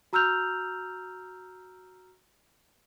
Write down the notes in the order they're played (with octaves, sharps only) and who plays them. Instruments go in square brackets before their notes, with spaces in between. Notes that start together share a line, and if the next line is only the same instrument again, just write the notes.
[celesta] F#4 A#5 E6 F6 G6 F7